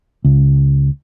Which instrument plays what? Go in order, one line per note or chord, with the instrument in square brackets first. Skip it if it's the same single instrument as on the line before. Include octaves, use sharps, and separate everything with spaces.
[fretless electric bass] C#2